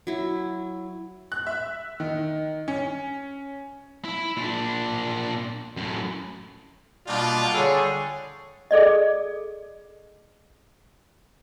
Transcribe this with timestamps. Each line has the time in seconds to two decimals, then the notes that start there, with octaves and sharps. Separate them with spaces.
0.07 F#3 E4
1.32 F#6
1.47 E5
2.00 D#3
2.68 C#4
4.04 E4
4.37 A#2 D4
5.77 F#2 A2
7.07 B2 G3 A#3 D4 F4
7.53 D3 G3 G#4 A4 C#5
8.71 G#4 A4 D5 D#5